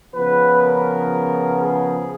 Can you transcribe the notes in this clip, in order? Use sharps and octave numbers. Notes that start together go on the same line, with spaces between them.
C#3 F3 B3 B4
A#4
G#4